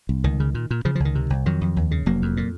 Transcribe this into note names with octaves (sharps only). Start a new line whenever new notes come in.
C2
C#2 D#3
C#3
A#2
A#2
C#3 F3
F3
C#2 D#3
C3
C2
F2 D#3 F#3
F2
D#2
C#3
F1 F#3 A#3
F2
A#2